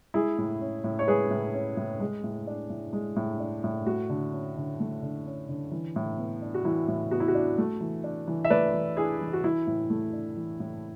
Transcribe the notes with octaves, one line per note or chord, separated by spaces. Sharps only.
G#3 E4 G#4
A2
C#4
A2
C#5
G#3 G#4 B4
A2
C#4
A2
G#3
A2
D4
A2
G#3
A2
D4
A2
A3 F#4
D3
C#4
D3
A3
D3
C#4
D3
E3
A2
B3
D4
F#4
E3 E4
A2
B3 F#4
E4
F#4
D4
A3
E3
D4
E3
E5
A3 B4 D5
E3
D4 E4 G#4
E3
F#4
E3 E4
A2
A3
D4
E3
A2